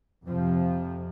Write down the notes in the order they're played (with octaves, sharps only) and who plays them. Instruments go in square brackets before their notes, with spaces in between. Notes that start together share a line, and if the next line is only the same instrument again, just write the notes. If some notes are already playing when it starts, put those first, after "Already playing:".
[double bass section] F2 C3 F3